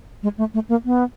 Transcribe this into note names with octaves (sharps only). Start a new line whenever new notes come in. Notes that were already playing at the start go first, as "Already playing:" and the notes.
G#3
A3
A3
A#3
B3